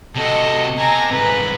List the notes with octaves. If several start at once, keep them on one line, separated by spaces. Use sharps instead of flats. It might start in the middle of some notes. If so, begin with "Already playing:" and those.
C3 F#4 A4 D#5
C3 G#5 A#5
C2 G#2 B4